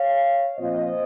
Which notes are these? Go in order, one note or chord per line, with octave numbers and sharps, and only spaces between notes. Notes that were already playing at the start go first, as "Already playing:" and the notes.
Already playing: C#5 F5
A#2 F3 C4 F4 C5 D#5